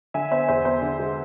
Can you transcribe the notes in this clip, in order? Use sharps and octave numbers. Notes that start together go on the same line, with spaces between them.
D3 E5 G#5
B3 C5 E5
E2 C5
B3 C5
D3
G#3